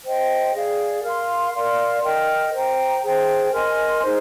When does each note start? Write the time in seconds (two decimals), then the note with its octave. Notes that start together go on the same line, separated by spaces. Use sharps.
0.05 C5 D#5 G5
0.55 G#4 D5 F5
1.04 A#4 F5 C6
1.54 A#4 D5 F5 C6
2.04 A#4 D#5 G5
2.53 C5 G5 A#5
3.03 G#4 C5 G5
3.53 A#4 D#5 G#5 C6
4.02 D#4 G#4 C5